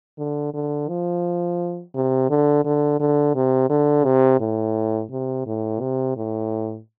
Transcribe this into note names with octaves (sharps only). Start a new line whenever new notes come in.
D3
D3
F3
C3
D3
D3
D3
C3
D3
C3
A2
C3
A2
C3
A2